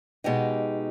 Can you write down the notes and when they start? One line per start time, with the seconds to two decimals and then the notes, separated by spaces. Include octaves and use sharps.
0.24 B2 G#3 D#4 G4